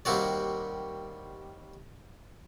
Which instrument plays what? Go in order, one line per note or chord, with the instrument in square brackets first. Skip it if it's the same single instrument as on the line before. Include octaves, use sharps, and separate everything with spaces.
[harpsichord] D#2 G3 A#3 C4 F#4 D5